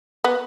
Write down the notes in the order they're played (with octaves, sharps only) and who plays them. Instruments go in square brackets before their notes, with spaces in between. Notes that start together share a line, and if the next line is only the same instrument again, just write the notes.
[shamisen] B3